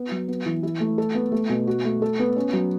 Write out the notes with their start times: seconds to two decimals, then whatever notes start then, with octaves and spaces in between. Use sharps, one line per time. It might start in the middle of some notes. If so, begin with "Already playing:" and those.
Already playing: B3
0.11 F#3
0.28 B3
0.46 E3
0.63 E4
0.80 A3
0.98 A4
1.15 B3
1.32 A3
1.49 B2
1.67 F#4
1.85 A3
2.02 A4
2.19 B3
2.36 C#4
2.53 F#3